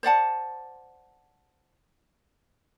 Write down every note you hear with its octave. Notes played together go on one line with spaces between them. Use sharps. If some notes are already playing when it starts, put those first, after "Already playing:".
C5 D5 F#5 A5